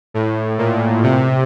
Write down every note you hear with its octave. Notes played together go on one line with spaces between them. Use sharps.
A2
A#2
C3